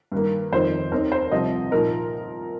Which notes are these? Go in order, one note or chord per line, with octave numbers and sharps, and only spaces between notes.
G2 D#3 A#3
G1 F2 D#3 C5
D#2 D#3 C4 D#4 A#4
C5
C2 C3 F3 C4 D#5
A#2 F3 A#3 D#4 A#4